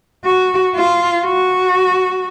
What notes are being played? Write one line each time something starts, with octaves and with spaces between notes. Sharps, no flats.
F#4
F4
F#4